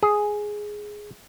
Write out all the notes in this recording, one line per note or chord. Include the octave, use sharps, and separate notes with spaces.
G#4